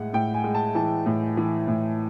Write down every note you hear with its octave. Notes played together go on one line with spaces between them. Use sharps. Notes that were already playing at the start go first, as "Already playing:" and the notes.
Already playing: A2 G#3 F#5
A2 G5
G#5
G#3
A5
E3 A5
A2
E3
A2